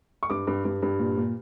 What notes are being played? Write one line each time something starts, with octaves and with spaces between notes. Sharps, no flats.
C#6
G2 D6
G2
G2
G2
A#2
A#2